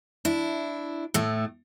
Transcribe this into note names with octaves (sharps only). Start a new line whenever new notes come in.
D4 E4
A2 A3